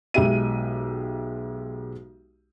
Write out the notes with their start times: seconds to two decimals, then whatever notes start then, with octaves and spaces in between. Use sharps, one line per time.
0.14 B1 G#3 G4 E5 D#7